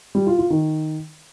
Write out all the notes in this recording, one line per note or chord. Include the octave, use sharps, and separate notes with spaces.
G3
F4
F4
D#3